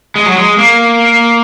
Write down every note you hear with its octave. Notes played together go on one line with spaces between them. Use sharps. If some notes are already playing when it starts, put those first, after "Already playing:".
G#3
F#3
G#3
A#3